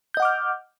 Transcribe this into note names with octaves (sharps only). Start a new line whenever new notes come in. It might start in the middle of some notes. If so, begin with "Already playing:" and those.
D#5 F#5 D6 F6 G6